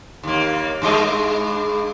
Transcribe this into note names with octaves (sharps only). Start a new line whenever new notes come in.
D#2 A#3
G2 G#3 D#5